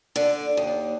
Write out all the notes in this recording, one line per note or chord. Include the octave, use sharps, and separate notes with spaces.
D3
D#2